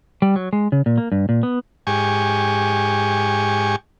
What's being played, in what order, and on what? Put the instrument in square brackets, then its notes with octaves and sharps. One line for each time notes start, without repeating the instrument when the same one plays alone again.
[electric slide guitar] G3
F#3
G#3
C#3
A#2
A#3
G2
A#2
B3
[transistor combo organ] G#2 G4 G#5 C#6